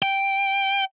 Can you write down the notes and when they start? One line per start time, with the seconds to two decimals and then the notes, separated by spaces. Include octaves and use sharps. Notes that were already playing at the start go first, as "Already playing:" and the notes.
0.02 G5